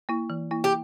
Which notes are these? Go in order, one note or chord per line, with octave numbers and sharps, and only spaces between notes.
A#3 E4
E3
A#3 E4
G4